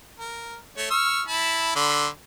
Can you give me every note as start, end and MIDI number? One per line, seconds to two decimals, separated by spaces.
0.20 0.57 70
0.77 0.88 57
0.77 0.88 73
0.90 1.22 85
0.90 1.22 88
0.90 1.22 89
1.28 1.75 64
1.28 1.75 81
1.28 1.75 83
1.76 2.07 50
1.76 2.07 83
1.76 2.07 84